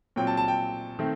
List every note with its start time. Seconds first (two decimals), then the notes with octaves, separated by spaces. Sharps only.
0.16 A#2 F#3 C4 G5
0.27 A5
0.37 A5
0.48 G5
0.99 D#3 A3 C4